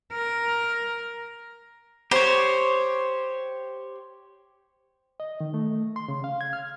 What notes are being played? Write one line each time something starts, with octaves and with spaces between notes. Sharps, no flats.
A#4
G4 C5 C#5
D#5
D#3
A3
C6
C#3
F5
G#6
F6